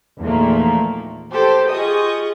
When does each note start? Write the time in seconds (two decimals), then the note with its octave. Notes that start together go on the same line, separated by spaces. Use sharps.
0.21 E2 A#2 D#3 F3 A3 A#3
1.31 G4 A4 C5 G5
1.71 F4 G4 G#4 D#5 C#6 D#6